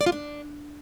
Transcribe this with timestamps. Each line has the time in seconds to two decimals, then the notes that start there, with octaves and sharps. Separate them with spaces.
0.01 D5
0.06 F4
0.12 D4